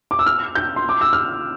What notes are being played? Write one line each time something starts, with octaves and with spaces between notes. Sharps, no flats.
D6
E6
F6
G6
C6
D6
E6
F6